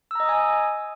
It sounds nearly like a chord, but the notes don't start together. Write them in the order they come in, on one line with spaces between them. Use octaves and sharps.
E6 A#5 D#5 D#6 G#5